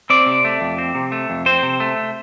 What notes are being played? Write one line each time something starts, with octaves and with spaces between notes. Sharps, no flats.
C4 D5
C3
A3
F2
C4
C3
A3
F2
C4 C5
C3
A3